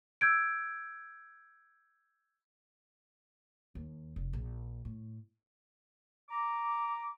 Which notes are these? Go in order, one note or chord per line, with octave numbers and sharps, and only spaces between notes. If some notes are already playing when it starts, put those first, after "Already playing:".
E6 G6 G#6 D7
D#2
F1
A#1
A2
A#5 D6